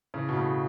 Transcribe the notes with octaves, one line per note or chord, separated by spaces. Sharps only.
C#3 E3
B2
A2 C#3